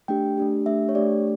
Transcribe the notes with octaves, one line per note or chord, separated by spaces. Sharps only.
A3 D4 G4 G5
A3 D4 G4
A3 D4 G4 E5
C#5
A3 D4 G4 D5